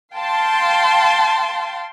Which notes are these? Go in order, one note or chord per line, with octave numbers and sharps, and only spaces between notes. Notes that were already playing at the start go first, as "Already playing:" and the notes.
F5 G5 A5 C6